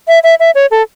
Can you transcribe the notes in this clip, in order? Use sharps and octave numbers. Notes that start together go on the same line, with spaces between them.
E5
E5
E5
C#5
A4